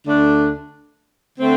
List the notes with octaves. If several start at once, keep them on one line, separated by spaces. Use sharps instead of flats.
D2 D3 A3 D4
D3 A3 C4